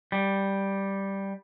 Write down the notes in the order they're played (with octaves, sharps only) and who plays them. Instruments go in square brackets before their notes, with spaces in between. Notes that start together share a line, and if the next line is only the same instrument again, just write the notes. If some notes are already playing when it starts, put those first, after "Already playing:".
[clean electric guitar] G3